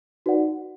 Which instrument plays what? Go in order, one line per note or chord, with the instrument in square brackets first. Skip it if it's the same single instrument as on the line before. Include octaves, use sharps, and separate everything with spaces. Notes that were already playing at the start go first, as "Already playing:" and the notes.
[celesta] D#4 F#4 B4 D5 F#5